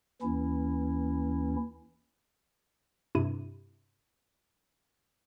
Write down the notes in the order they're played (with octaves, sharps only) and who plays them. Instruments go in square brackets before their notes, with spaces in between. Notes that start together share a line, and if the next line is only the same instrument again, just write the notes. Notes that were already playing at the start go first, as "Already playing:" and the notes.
[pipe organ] D#2 E3 C#4 E4
[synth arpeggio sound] G2 C3 E4 D#7